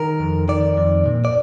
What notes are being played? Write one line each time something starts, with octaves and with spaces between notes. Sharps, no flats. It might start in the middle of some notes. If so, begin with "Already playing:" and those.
Already playing: D#3 A#4
F2
D#3 D5
F2
A#2
D5